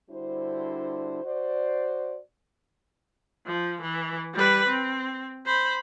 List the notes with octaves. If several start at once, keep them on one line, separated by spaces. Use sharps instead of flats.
D3 G3 D4 E4 F#4 C5
F#4 C5 D5
F3
E3
G3 B4
C4
C5 B5